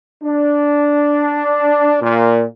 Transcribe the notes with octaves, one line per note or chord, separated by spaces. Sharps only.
D4
A#2